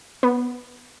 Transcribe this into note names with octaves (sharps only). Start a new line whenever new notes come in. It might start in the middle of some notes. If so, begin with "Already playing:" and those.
B3